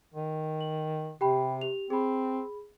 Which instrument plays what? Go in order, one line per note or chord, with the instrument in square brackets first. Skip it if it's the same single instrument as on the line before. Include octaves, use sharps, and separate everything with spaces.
[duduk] D#3
[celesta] F#7
[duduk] C3 [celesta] G4 G5 B5
[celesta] G4 F7
[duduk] C4 [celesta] G#4 B5